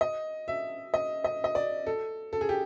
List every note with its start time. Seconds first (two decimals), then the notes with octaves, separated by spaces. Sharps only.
0.01 D#5
0.48 E5
0.94 D#5
1.24 D#5
1.44 D#5
1.55 D5
1.87 A4
2.33 A4
2.41 G#4
2.49 G4